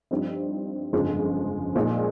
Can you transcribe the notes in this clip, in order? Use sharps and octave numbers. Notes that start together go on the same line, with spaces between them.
G2 F3 C4 D#4
G1 F2 C#3 F3 G#3
A#2 F3 G#3 D#4